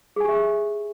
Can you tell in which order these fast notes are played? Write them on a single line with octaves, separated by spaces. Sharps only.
G#4 G#5 G4 E5